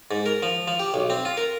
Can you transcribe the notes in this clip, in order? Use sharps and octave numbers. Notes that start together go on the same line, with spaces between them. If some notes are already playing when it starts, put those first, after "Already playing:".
G#2
A#4
F3
F3
G4
B1
C4
F4
A#4